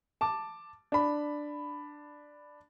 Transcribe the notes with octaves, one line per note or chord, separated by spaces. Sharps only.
A5 D6
D4 B5